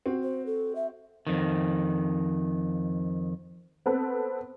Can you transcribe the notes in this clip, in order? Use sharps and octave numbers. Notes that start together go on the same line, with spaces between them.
C4 F#4
C5
A4
E5
F2 D#3
B3 C4 A4 B4